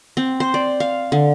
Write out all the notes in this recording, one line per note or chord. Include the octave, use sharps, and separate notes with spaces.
C4
C5
D5
F5
D3